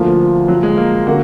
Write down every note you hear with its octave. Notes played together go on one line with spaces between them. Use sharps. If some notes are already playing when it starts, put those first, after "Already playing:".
Already playing: D2 D3 F3 A#3 F4
F#3
G#3
A#3
D3 F#3 A#3 F#4